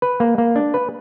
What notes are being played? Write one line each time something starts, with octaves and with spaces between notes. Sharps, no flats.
B4
A#3
A#3
D4
B4